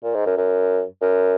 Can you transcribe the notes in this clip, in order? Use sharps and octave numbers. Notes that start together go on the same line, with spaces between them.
A#2
G#2
F#2
F#2
F#2